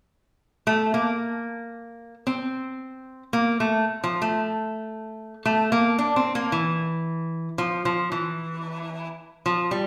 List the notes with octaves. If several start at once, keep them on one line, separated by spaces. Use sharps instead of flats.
A3
A#3
C4
A#3
A3
F3
A3
A3
A#3
D4
C4
A#3
E3
F3
F3
E3
F3
G3